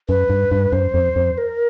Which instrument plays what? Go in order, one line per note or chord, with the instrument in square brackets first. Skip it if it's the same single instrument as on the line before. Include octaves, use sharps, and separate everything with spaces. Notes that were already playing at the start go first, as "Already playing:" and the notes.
[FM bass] F#2 [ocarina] B4
[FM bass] G2
G2
[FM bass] F#2 [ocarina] C5
[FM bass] F2
F2
[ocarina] A#4